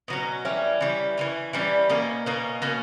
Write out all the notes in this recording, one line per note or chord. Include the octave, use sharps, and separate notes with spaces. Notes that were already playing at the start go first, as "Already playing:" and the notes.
B2 F#3 C#4
E3 G3 C#4
E3 G3 C#4
E3 G3 C#4
E3 G3 C#4
B2 A#3 C#4
B2 A#3 C#4
B2 A#3 C#4